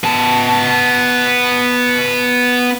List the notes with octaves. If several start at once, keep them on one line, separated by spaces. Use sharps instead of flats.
B3 A5